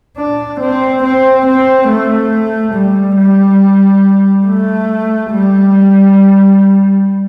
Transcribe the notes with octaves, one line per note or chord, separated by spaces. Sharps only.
D4
C4
C4
C4
A3
G3
G3
A3
G3